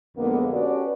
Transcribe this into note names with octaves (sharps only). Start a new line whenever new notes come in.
B1 F2 D3 G#3 A#3 B3
C#4 F#4 G4 A4 B4 D5